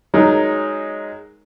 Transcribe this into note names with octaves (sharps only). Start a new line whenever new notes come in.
F#3 G#3 D#4 A#4